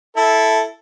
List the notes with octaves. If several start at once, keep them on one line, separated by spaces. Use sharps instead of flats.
E4 A4